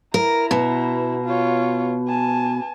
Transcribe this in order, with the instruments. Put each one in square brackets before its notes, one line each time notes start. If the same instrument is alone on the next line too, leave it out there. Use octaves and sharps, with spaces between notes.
[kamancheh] E4 A#5 [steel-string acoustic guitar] A#4
[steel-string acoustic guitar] B2
[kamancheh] F4 C#5
G#5 A5